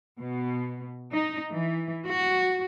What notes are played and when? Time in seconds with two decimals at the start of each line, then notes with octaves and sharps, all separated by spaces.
0.19 B2
1.13 D#4
1.53 E3
2.05 F#4